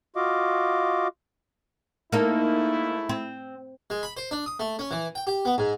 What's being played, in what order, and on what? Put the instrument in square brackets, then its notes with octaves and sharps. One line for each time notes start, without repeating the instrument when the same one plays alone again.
[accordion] F4 F#4 D#5 F5 D6
[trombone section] G#2 A3 E4 [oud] A#3 D#4 A4
[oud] C4
[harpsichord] G#3
B5
C5
D4
D#6
A3
C#4
E3
G5
G4
B3
G#2